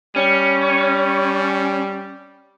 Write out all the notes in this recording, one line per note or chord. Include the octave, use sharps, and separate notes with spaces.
G3 C#4